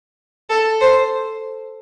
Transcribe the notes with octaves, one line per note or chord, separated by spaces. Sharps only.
A4
C5